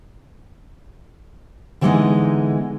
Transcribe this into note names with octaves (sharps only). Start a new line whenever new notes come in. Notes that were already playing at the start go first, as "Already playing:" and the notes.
D3 E3 G3 G#3 B3 D#4